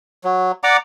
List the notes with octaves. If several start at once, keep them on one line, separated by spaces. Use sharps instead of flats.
F#3
D5 F#5 A#5 D6